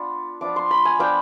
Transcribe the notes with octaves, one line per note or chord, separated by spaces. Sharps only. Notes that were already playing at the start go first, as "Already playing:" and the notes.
Already playing: B3 D4 F4
F3 B3 D4 F4 D6
C6
B5
G#5
F3 B3 D4 F4 G5